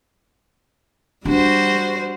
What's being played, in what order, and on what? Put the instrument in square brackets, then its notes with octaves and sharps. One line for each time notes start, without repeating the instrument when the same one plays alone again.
[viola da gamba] G3 F#4 C5 [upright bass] D4